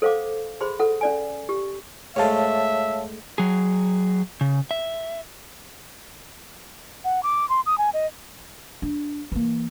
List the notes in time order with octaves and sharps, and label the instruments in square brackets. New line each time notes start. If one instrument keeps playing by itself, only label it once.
[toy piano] A4 C5 F5 F#5 D6
G#4 C5 B5 C6
A4 F#5
C#4 D5 G#5
G4
[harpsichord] G#2 G#3 A3 [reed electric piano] C#5 F5 A5 [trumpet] E5
[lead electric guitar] F#3 G#4
C#3
E5
[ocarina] F#5
D6
C6
D#6
G#5
D#5
[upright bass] D4
E3 A#3